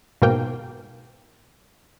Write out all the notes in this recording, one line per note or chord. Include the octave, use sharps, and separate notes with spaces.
G#2 B2 A#3 A#4 G5